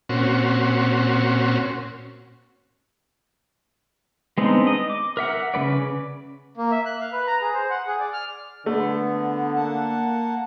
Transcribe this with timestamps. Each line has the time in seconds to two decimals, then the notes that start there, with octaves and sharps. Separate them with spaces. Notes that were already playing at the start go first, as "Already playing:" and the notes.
0.09 A#2 C4 C#4 F#4
4.38 G#3 B3 C4 D4 D#4
4.67 D#5
4.90 D6
5.17 A#4 E5 F#5
5.54 C#3 A#3 B4 D5
6.57 A#3
6.71 E5
6.86 F#6
7.00 F5
7.13 B4
7.27 A#5
7.41 G#4
7.54 C5
7.70 F#5
7.87 G#4
8.00 D5
8.13 F6
8.66 D3 A3 B3
9.55 A#3 F#5 A5